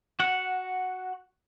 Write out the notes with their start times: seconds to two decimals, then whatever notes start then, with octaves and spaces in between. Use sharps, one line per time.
0.20 F#4 F#5